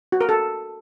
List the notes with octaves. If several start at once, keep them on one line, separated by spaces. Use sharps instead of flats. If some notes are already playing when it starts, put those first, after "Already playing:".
F#4
A#4
A4